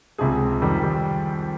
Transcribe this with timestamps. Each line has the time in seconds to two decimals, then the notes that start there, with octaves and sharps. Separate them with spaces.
0.18 C#2 C3 F3 G#4
0.62 F2 D#3 G3 G4
0.83 G4